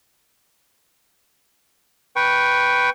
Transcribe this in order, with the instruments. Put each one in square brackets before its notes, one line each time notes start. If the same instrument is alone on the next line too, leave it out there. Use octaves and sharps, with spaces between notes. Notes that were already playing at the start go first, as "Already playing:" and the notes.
[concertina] B4 G5 C#6